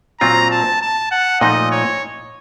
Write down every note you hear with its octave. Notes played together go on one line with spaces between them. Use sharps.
A#2 F#3 C4 F4 A#5
A5
A5
F#5
A#2 F3 A3 D#4 D#5
C#5